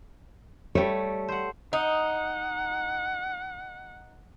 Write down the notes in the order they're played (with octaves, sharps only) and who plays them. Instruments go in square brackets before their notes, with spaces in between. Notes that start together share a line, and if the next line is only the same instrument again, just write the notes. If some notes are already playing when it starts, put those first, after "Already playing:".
[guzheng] G3 A3 [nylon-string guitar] C#5
[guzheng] C5 F#5
[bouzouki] D#4 [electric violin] F#5